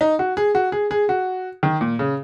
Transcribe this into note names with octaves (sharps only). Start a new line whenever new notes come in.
D#4
F#4
G#4
F#4
G#4
G#4
F#4
D#3
A#2
C#3